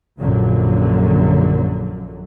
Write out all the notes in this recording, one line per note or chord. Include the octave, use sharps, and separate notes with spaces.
A#1 F#2 A#2 D3 F#3